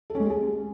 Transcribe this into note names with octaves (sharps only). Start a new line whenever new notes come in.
A4
C#4
G#3
G4
G#4